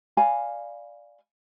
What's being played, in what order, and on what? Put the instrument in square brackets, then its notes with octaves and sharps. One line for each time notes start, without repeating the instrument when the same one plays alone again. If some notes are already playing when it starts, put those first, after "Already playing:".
[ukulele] D5 F5 G#5 B5